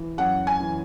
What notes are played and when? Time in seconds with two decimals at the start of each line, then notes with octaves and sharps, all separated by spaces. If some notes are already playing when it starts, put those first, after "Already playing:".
Already playing: E3
0.18 F#2 F#5
0.47 G#5
0.60 E3